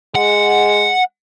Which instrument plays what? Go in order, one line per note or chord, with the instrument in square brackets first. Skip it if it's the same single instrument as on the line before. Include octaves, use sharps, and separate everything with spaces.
[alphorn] G#3 [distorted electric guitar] F#5